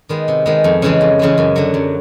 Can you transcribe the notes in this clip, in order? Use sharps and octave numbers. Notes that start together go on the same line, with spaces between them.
D#3 G#3 B3
C3
D#3 G#3 B3
F2
C#3 E3 G#3
F2
C#3 E3 G#3
F#2
D3 F#3
F#2